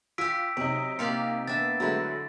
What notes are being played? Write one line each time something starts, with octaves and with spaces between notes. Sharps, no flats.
F4 G4 G#5 E6 B6 D7
C3 F#3 D#4 D7
A#3 F4 G4 D5 C#7
A#3 B3 D4 E5 A6
D3 F#3 G#3 A3 E4